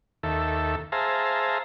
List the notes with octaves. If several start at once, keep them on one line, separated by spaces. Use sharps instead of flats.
D#2 A4 E5
G#4 C5 E5 F5 A5 A#5